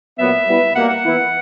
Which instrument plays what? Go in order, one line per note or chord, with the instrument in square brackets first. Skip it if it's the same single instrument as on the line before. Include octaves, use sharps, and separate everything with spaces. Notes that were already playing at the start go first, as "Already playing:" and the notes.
[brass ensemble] A#2 F#3 B3 [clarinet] E5
[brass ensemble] G3 B3 E4 B4
[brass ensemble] B2 G3 A#3 [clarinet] F#5
[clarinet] F#5
[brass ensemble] E3 B3 E4